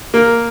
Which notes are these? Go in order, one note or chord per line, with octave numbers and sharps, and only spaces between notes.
A#3